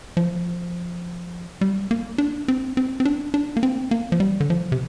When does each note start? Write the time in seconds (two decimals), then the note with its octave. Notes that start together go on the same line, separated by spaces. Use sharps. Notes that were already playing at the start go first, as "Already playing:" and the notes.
0.17 F3
1.61 G3
1.91 A#3
2.18 D4
2.48 C4
2.77 C4
3.00 C4
3.05 D4
3.34 D4
3.57 A#3
3.63 C4
3.91 A#3
4.12 F3
4.20 G3
4.40 D3
4.50 F3
4.72 C3